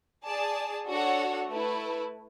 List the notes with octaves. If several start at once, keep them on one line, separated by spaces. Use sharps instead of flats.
G#4 D5 A5
D4 F#4 A4 C#5 F#5
A3 E4 B4